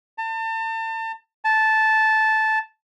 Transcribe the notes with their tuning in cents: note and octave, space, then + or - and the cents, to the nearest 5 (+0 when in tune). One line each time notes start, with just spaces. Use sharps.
A5 +35
A5 -10